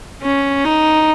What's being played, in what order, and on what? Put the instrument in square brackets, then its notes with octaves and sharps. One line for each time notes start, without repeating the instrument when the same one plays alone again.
[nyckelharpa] C#4
D#4